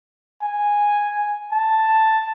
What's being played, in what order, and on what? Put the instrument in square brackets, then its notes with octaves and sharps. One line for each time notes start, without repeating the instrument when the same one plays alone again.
[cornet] G#5
A5